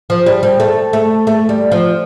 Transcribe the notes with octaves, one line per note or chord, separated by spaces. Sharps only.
F3
G3
G3
A3
A3
A3
G3
F3